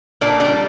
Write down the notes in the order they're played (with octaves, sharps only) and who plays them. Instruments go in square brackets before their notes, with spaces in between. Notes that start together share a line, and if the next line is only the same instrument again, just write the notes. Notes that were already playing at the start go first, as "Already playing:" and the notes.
[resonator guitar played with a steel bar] A#2 D4 D5
G3 D4 D5